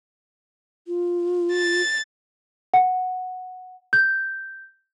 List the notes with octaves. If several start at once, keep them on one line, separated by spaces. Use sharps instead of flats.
F4
A6
F#5
G6